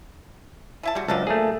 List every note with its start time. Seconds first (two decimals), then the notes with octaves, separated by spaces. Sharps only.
0.83 E3 E4 A5
0.95 G3 G#3 F#4
1.08 C#2 F#2 F3 D4 A4
1.27 A3 A#3 G#4